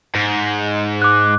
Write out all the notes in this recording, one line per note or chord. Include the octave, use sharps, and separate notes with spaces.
G#2
D6 F#6